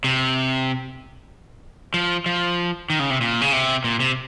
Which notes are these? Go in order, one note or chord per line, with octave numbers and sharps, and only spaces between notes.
C3
F3
F3
D#3
C#3
C3
A#2
C#3
C3
A#2
C3